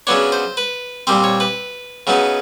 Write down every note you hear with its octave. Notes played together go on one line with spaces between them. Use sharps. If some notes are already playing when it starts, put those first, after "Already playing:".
C#3 F#3 B3 D4 C#5
C5
B4
A#2 G3 C4 C5
C#5
B4
C#3 F#3 B3 D#4